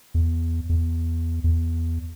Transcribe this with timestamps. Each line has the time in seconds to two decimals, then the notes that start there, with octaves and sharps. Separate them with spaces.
0.14 E2
0.69 E2
1.44 E2